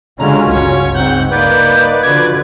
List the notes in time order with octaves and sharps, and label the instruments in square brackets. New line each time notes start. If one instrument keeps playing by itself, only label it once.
[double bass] D3 G#3 [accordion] C#4 [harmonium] F4 F#4 [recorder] A#5
[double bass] G1 C#2 [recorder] C#5
[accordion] G#2 G6 [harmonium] C4 [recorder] F#5
[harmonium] A#3 D#4 F#5 [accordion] B4 D5 [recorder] G6
[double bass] D3 [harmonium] F3 F#4 [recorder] G#6